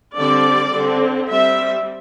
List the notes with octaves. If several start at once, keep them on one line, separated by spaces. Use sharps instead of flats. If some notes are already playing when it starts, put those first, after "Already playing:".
D3 G3 C4 D5
D3 C4
G3 C4 E5